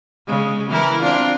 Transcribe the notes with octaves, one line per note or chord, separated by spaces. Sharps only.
C#3 G#3
E3 E4 A#4
C4 D4 F4